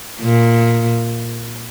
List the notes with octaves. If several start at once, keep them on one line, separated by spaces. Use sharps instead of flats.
A#2